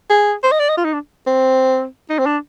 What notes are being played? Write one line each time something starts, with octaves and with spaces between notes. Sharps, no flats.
G#4
C5
D#5
D5
D#5
F4
D#4
D4
C4
D#4
C4
D4